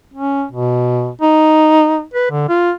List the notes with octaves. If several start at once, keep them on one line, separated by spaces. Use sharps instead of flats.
C#4
B2
D#4
B4
D3
F4